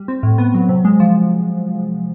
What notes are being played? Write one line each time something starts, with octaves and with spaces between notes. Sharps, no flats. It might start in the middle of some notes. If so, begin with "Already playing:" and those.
Already playing: G3
C4
A2
B3
F#3
C3
G#3
F3